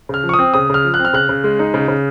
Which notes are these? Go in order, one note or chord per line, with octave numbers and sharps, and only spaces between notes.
C#3 F6
F3
C#6
D#6
C4
C#3 D#6
C#3 F6
F3
F#6
C4
F6
C#3 F#6
C#3
G#3
D#4
C#3
C#3